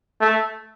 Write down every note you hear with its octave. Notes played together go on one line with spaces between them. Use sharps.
A3